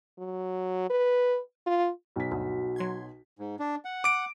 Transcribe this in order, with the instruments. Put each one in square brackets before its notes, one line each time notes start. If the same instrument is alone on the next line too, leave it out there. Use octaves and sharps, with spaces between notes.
[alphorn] F#3
B4
F4
[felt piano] B1 B6
[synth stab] D2 G2 [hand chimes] F#4
[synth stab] F#3 C6 G#6
[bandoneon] G#2
D4
F#5
[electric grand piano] D6 D7